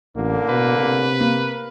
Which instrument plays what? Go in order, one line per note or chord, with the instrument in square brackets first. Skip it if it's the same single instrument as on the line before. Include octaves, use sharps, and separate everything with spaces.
[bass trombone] A1 [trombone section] A2 D3 A#3
[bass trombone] B2 [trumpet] B4
[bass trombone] C3
[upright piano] A#3